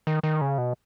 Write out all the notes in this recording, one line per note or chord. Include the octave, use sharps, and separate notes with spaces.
D#3
D#3
C#3
B2